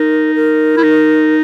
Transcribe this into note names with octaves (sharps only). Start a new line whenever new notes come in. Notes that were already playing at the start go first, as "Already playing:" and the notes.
Already playing: D#4 A#4
A#4
E4
D#4